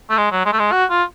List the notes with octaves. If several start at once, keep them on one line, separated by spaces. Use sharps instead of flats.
A3
G#3
F#3
G#3
A3
G#3
F#4
F4